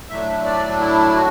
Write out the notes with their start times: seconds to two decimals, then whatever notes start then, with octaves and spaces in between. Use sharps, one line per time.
0.09 A2 F#3 A3 D4 E5
0.45 D5
0.80 E4
1.15 F#4